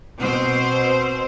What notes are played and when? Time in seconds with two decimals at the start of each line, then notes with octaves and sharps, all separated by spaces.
0.19 B2 C4 C5